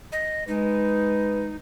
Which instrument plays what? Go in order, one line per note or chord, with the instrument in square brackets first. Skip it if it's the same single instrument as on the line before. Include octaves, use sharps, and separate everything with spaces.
[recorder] D#5
[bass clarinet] G#3 [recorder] D#4 [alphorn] B4